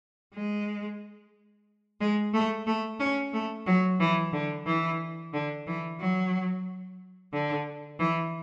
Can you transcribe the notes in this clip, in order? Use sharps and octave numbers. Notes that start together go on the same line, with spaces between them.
G#3
G#3
A3
A3
C#4
A3
F#3
E3
D3
E3
D3
E3
F#3
D3
E3